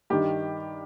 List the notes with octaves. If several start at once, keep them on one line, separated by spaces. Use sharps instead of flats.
G2 D#3 G4